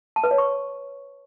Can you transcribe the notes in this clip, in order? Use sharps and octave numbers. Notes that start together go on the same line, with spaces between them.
A5
B4
C#5
C#6